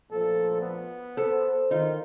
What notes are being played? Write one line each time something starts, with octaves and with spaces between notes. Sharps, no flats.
D2 A#2 F3 A4
B3
A4 C5
D#3 D#4 F4